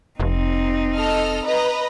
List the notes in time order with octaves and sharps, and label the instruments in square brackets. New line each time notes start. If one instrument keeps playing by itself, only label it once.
[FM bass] F1 [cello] C4 D#4
[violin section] A4 D#5 F6
B4 D#5 A#5